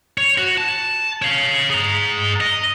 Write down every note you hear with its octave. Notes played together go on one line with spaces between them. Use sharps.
C#5
F#4
A5
C#5 F5
G#4 A#5
D#5